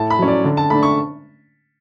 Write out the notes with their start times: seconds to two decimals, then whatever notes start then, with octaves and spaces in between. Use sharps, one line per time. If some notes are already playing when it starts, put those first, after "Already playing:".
Already playing: A2 A5
0.10 B5
0.19 F#3 C#4
0.28 D5
0.44 D3
0.57 A5
0.70 A3 D4 B5
0.83 C#6